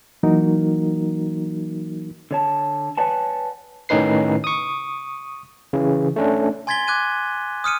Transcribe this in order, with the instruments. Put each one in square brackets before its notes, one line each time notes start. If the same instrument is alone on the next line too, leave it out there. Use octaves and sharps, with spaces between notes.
[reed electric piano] E3 F#3 A#3 D#4 F#4 A#4
[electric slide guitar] D3 C#5 A5
B4 C#5 D5 F#5 G#5 A5
[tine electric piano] A2 D#3 C#4 D#4 B4 C7
C#6 D#6
C#3 E3
A3 C#4 D4
[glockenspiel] G#5 C6 G#6 A6 B6 G7
D6 F#6 G#6 D#7
D#6 F6 C#7 D#7